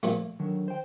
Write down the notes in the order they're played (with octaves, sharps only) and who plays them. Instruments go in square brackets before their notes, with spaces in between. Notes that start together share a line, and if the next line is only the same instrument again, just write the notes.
[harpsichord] A#2 F3 A3
[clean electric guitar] D3 D#3 F#3
C5 G5